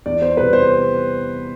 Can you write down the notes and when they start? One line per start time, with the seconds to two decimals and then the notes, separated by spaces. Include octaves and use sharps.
0.06 E2 D5
0.22 C5
0.37 C3 G3 B4
0.53 C5